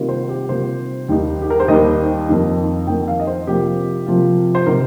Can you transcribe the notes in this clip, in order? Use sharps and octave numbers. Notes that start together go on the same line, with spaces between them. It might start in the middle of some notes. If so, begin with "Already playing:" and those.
Already playing: C3 D#3 G3 A#3 F4
C5
G4
C3 D#3 G3 A#3 F4 C5
D#2 D#3 G3 A#3 D#4
G4
A#4
C5
D#2 D#3 G3 A#3 D#4 D#5
F2 D#3 A#3 D#4
F2 D#3 A#3 D#4 G5
F5
D#5
C5
C3 F3 A#3 F4 G4
C3 F3 A#3 F4
C5
C3 D#3 A#4